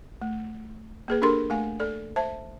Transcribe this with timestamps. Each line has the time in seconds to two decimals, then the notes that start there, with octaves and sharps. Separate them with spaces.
0.22 A3
1.08 A#3 G#4 B4
1.22 D4 G4 A4 A#4 C6
1.50 A3 F5 G#5
1.80 A4 D5
2.16 C5 E5 A5